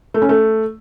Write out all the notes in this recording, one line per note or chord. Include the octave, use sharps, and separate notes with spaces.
A3
C#4
A3